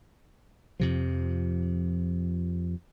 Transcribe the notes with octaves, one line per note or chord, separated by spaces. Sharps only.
F2 C3 F3